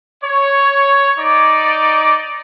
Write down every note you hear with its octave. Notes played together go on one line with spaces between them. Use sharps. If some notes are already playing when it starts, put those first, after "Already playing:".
C#5
D#4 D5